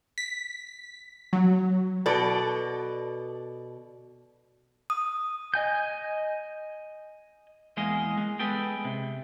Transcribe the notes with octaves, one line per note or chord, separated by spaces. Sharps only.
B6
F#3
B2 A4 D5
D#6
D#5 G#5 G6
E2 G#3 A#3 G#4 D#5
G#3
G#3 B3 G#4 A4 B4 G5
C3